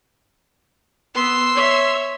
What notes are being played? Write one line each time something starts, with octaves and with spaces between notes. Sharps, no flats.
B3 C6 E6
C#5 E5